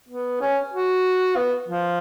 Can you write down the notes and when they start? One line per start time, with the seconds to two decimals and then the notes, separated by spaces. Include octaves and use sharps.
0.08 B3
0.41 C#4
0.73 F#4
1.36 B3
1.68 F3